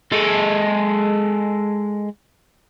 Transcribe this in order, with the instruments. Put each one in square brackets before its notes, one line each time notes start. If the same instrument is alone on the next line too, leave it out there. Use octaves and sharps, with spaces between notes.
[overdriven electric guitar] G#3 A4